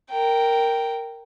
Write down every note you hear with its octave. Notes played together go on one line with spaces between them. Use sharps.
A#4 G5